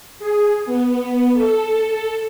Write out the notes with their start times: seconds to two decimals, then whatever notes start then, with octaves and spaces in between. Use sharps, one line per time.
0.19 G#4
0.66 B3
1.34 A4